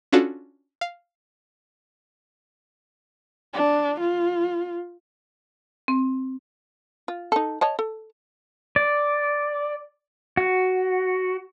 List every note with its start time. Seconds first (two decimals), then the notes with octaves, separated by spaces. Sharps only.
0.12 C#4 D4 F4 F#4 A4
0.81 F5
3.54 D4
4.00 F4
5.88 C4
7.08 F4
7.32 D#4 A4
7.61 C#5 D#5 A5
7.79 A4
8.76 D5
10.37 F#4